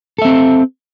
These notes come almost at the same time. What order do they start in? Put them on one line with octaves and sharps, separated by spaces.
A4 E5 C4